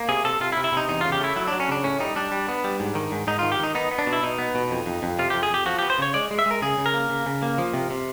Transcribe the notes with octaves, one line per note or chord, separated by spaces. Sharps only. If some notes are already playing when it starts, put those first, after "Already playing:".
Already playing: A#3
C3 G#4
C3 A4
C3 F4
E4
C3
E4
C3 D#4
E2 D#4
C#3 F4
G4
A3 E4
F#3 E4
F#3 D4
C#4
C#3 D4
A2 C#4
G3 D#4
G3 D4
G3
B3
G3
G#2
D#3
G#2
G#2 D#4
D#3 F4
G4
D#3 D#4
B3 D#4
B3
D4
B2
E4
B2 D#4
B3
B2
F2
F2
F2
C3 F4
F2 G4
G#4
F2 G4
F3 F#4
B3 G4
C5
C#3 C#5
G#3 D5
G#3
E5
G#3 A#4
C#3 G#4
C#3
A#4
A#3
C#3
C#3
A#3
F3
C3
C3